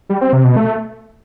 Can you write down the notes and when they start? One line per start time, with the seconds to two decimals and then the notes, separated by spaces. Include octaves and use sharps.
0.09 G3
0.21 C4
0.33 C3
0.45 B2
0.56 A3